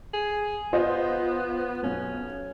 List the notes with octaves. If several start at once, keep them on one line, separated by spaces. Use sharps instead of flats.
G#4
B3 F4 C5 D#5
B1 C#4